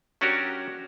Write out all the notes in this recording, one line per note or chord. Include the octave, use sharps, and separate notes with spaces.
F#3 C#4 D4 F#4 G4 A#4